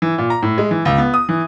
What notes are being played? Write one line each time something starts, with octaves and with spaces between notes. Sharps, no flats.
E3
A#2
A#5
A2
G#3
E3
C#2
B3
D#6
E3